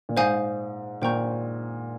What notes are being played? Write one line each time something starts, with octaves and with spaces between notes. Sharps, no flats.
A#2
G#2 C5 F5 G#5 D#6 G6
A#2 C5 G5 A#5 C#6 G6